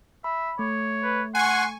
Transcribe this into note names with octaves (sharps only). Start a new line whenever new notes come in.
E5 B5
A3 C#5
B4
F#5 G#5 C6 C#6